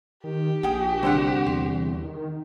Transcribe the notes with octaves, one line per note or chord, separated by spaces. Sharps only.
D#3 G4
A#1 G#4 G5 D#6
C2 D3 C5 F#5
E2 C6
D#3